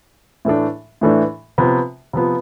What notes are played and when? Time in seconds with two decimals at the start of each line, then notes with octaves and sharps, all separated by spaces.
0.45 A2 E3 A3 D4
1.01 A2 E3 A3 D4
1.58 C3 F3 B3
2.13 C3 F3 B3